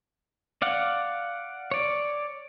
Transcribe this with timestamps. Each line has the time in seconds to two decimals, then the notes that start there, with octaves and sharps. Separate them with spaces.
0.62 D5 F5 F#5
1.71 C#5 D5